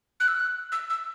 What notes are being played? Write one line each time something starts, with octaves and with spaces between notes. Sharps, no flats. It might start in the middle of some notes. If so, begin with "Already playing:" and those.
F#6
E6
F#6
E6
E6